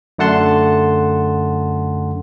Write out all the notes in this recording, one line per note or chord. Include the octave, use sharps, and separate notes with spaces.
F#2 D3 A3 F#5 A5 C6